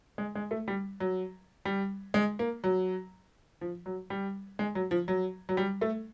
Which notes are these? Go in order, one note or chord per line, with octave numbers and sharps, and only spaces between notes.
G#3
G#3
A3
G3
F#3
G3
G#3
A#3
F#3
F3
F#3
G3
G#3
F#3
F3
F#3
F#3
G3
A3